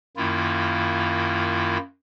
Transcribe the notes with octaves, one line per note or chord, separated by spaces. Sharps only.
F#2 D#3 A#3 E4 F4